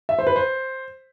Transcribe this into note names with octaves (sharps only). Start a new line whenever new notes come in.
E5
C5
B4
C5